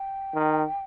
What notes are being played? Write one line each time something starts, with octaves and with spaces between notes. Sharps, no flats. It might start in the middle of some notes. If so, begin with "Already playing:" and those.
Already playing: G5
D#3